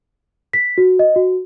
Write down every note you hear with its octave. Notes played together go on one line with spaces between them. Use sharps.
B6
F#4
D#5
F#4